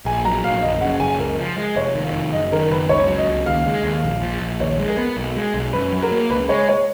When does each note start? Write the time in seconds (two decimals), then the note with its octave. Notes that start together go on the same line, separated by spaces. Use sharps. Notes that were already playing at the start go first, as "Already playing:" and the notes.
0.05 A#1 G#5
0.25 F#3 A#5
0.44 A#1 F5
0.62 F#1 D#5
0.81 C#3 F#5
1.00 F#1 G#5
1.19 C#2 A#4
1.39 F3
1.58 G#3
1.76 F1 C#5
1.95 D#3
2.04 F5
2.13 F1
2.33 F#1 D#5
2.52 D#3 A#4
2.71 F#1 B4
2.89 C#2 C#5
3.08 F#3
3.18 D#5
3.28 C#2
3.46 D#2 F5
3.66 G#3
3.84 D#2
4.04 A#1
4.23 F3
4.41 A#1
4.60 D#2 C#5
4.79 G#3
4.89 A#4
4.98 B3
5.17 B1
5.36 G#3
5.54 B1
5.73 F#2 B4
5.93 F#3
6.03 A#4
6.11 A#3
6.30 C#2 B4
6.49 G#3 C#5
6.69 C#5